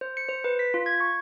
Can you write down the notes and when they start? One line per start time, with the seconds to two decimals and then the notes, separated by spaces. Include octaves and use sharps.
0.01 C5
0.17 C#7
0.29 C5
0.44 B4
0.59 B6
0.74 F4
0.86 G#6
1.00 C#6